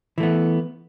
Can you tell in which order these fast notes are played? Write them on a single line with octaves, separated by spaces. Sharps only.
E3 A3 B3